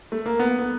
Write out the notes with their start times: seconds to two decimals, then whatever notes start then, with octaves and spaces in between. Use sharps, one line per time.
0.12 A3
0.26 A#3
0.39 B3
0.59 B3